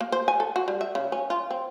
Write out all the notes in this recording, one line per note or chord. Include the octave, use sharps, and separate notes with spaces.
A#3
C5
G#5
A4
F#4
G3
E5
C#3
C#4
F4
C4